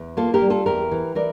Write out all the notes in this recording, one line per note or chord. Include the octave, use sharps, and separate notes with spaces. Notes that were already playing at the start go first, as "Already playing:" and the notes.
Already playing: E2
A#3 F4 A4
G4 A#4
G3
F4 A4
E2 G4 A#4
E3
E3 A#4 D5